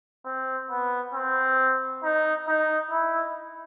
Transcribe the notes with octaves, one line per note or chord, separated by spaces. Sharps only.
C4
B3
C4
D#4
D#4
E4